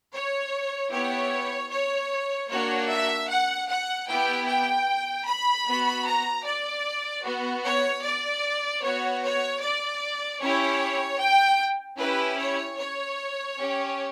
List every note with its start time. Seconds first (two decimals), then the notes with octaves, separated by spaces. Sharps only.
0.12 C#5
0.91 B3 E4 G4 C#5
1.70 C#5
2.49 A#3 D4 F#4 C#5
2.89 E5
3.28 F#5
3.68 F#5
4.07 B3 E4 G4 G5
4.47 G5
5.26 B5
5.66 B3 F#4
6.05 A#5
6.44 D5
7.24 B3 F#4
7.64 C#5
8.03 D5
8.82 B3 F#4 C#5
9.22 C#5
9.62 D5
10.41 C#4 E4 G4 C#5
11.20 G5
11.99 C#4 E4 G4 B4
12.38 C#5
12.78 C#5
13.57 C#4 G4